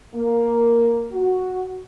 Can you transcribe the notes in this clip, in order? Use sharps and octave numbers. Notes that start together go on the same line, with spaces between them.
A#3
F#4